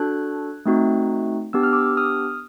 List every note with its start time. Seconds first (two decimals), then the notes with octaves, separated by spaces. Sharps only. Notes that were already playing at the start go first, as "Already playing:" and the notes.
Already playing: D4 F#4 A4 F#6 G#6
0.65 A3 C4 D#4 F#4
1.53 B3 D4 G4 E6
1.63 F6
1.73 D6 E6
1.97 D#6 F6